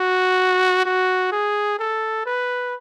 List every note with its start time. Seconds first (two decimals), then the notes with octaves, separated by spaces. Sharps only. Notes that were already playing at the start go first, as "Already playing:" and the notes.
Already playing: F#4
0.85 F#4
1.32 G#4
1.79 A4
2.26 B4